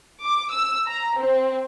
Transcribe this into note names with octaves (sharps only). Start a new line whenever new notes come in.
D6
E6
A#5
C4